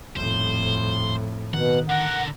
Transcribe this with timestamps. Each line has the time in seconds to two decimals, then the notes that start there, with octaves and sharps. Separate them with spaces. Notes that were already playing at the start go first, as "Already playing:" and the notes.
0.16 D#1 F2 A2 C5
1.54 B2 D#3 F#5
1.90 D3 A#4 F#5